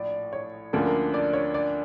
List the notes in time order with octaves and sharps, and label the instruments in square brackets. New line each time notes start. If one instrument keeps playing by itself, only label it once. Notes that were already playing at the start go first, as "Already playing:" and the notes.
Already playing: [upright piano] A#1 A2 F3 [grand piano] D5
[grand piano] C#5
[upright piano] D2 D3 F3 A#3 C#4 [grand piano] A4
[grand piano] A#4
D5
C#5
D5